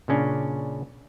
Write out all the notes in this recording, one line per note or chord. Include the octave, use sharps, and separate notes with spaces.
A#2 C#3 C#4 D4